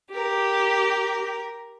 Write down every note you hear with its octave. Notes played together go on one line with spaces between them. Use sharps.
G4 A#4